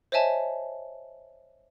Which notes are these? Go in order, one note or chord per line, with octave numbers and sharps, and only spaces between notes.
C5 C#5 D#5 E5 G#5 A5